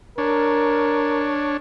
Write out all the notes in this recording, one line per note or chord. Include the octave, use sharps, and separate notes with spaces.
D4 A#4 C#5